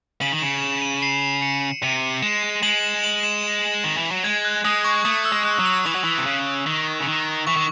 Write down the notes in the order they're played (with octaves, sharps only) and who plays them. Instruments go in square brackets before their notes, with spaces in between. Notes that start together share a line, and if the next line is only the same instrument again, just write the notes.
[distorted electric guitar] C#3 [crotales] F#7
[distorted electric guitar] D#3
[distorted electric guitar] C#3 [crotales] E7
[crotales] E7
D#7
C7
C#7
[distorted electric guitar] C3 [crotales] D#7
[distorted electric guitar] G#3 [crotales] E7
[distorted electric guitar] G#3 [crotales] F#7
[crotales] E7
F#7
E7
[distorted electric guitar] D#3
E3
F#3
[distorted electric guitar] G#3 [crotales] G#6
[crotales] F#6
[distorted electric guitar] G#3 [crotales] D#6
[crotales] C#6
[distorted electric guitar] A3 [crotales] D#6
[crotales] E6
[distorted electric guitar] G#3
[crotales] F#6
[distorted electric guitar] F#3
[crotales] D#6
[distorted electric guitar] E3 [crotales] C#6
[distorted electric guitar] F#3
E3
C3
C#3
D#3
C#3
D#3
[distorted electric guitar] E3 [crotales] C#6
[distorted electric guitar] D#3